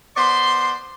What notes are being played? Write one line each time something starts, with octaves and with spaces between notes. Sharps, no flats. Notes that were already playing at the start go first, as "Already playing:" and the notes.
B3 C5 D5 C6